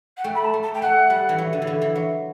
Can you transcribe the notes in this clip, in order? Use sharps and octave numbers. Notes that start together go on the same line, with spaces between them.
F#5
A3 G5
B5
A5
A3
A5
G5
A3 F#5
G3
E3
F#3
D3
E3
D3
E3
F#3